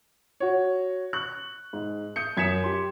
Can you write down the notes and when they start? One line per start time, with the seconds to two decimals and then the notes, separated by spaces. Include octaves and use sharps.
0.40 F#4 C#5
1.13 C#6 F#6
1.73 G#2
2.16 D#6 G6 C#7
2.37 F#2 G#6 B6 C#7 E7
2.64 G4 C6